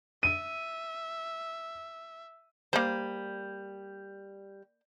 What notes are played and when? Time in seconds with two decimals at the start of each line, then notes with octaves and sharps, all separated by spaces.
0.23 E5 D#7
2.73 G3 A#3 C5